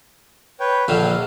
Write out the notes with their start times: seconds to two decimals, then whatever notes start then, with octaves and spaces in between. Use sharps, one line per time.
0.60 B4 C#5 G5
0.88 A#1 D3 F5